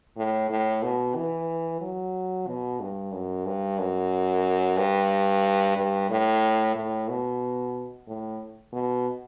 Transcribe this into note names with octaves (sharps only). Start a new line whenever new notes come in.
A2
A2
B2
E3
F#3
B2
G2
F#2
G2
F#2
G2
G2
A2
A2
B2
A2
B2